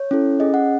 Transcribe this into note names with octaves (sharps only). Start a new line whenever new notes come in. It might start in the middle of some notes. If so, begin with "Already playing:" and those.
Already playing: C#5
C#4 E4 A4
C#4 G#4 D#5
F#5